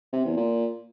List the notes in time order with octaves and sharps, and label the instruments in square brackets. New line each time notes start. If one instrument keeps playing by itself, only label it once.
[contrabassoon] C3
E2
A#2